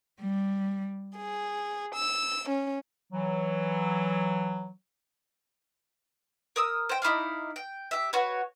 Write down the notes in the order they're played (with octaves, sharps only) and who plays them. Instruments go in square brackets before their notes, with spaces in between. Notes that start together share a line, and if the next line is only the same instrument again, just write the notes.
[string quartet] G3
G#4
E6
C#4
[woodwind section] E3 F#3
[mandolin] A#4 D#6 E6
C5 G5
D#4 E4 D5 F5
G5
G4 E5
F#4 B4 C#5